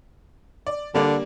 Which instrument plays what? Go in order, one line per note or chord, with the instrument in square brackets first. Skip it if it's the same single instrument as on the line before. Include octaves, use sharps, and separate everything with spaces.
[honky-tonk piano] D5
[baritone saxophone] D3 [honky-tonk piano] G3 A#3 D4